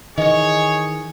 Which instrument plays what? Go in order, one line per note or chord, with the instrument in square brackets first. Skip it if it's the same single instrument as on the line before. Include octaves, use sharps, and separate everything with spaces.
[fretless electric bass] D#3 E3 [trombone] G#4 [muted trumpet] C#5 [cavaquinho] D#5 D#6